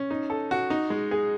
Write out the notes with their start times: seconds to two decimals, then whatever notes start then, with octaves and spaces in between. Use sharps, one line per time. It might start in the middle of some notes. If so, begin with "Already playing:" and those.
Already playing: C#4
0.10 D#4
0.30 A4
0.51 F#4
0.70 D#4
0.90 G#3
1.11 G#4